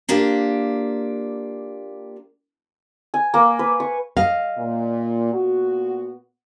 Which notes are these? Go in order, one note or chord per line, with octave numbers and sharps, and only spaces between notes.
A#3 D4 F4 G4
G#5
A#3
B4
C#6
D#5 F5
A#2
A#2 B3 F#4